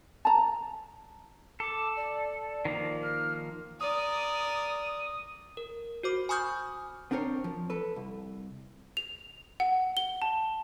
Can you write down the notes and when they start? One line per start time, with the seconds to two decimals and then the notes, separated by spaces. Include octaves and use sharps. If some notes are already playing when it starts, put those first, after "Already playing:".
0.25 A5 A#5
1.60 A4 D6
1.96 D5
2.65 D#3 F3 A#3
3.02 F6
3.81 A#4 D5 D#6
5.57 A#4
6.03 F#4 C5 D6
6.29 G#5 B5 C#6 D#6 F6 G6
7.11 B3 C4 D4 A#4 C5 C#5
7.44 F3
7.70 A4 B4
7.96 C2
8.97 F7
9.60 F#5
9.97 G7
10.22 A5